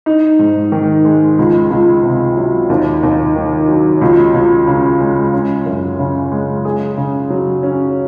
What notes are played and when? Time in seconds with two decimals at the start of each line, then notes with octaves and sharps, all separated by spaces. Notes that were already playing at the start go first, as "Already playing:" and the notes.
0.06 D#4
0.39 G#2
0.72 D#3
1.05 G#3
1.39 C#2
1.71 C#2
2.03 C3
2.37 F#3
2.70 D#2
3.03 D#2
3.36 D#3
3.68 F#3
4.01 C#2
4.34 C#2
4.67 C#3
5.00 G#3
5.33 C#4
5.66 F#2
5.99 C#3
6.32 G#3
6.65 G#4
6.97 C#3
7.30 F#3
7.63 C#4